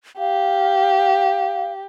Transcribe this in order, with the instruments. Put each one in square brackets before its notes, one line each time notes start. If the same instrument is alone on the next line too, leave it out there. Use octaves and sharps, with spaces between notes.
[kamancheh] G4 [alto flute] F5